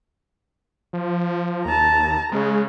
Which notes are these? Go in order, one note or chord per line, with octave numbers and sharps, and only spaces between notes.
F3
D#2 A5 A#5
C#3 G#3